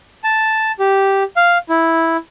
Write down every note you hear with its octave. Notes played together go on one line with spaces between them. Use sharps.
A5
G4
F5
E4